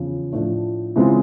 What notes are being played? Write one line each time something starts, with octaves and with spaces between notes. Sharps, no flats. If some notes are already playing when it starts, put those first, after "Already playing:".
Already playing: E2 C#3 F3
A2 F3 A3 D4
C#3 E3 G#3 C4 F4